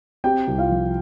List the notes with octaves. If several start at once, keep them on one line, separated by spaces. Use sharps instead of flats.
C4 G4 G5
C2
F4 F5
F3